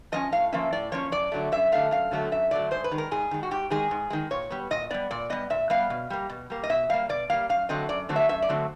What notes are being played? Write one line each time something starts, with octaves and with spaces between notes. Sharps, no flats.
F3 A#3 C#4 D#5
A2 F5
F3 A#3 C#4 E5
A2 D5
F3 A#3 C#4 C#5
F#2 D5
D3 F#3 A3
F#2 E5
D3 F#3 A3 F5
F#2 F5
D3 F#3 A3
F#2 E5
D3 F#3 A3 D5
G#2 C5
B4
D#3 G#3
A#4
G#2 G#4
D#3 G#3
F#4
G#2 G4
D#3 G#3 G#4
G#2
D#3 G#3
A#2 C#5
G3 B3
A#2 D#5
G3 B3 D5
A#2 D5
G3 B3 D#5
A#2 E5
G3 B3 F5
B2
G3 A#3
B2
G3 A#3
D#5
B2 E5
G3 A#3 F5
B2 D5
G3 A#3 F5
F#2 F5
D3 F#3 A3 C4 D#5
F#2 D5
D3 F#3 A3 C4
E5
F#2 E5
D5
D3 F#3 A3 C4